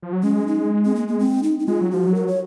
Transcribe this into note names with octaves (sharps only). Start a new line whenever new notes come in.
F3
F#3
G#3 C#4
D#4
C4
A#3
A#3
C4
D#4
D#4
G#3 F4
F#3
F3 F#4
F#3
A#4
C#5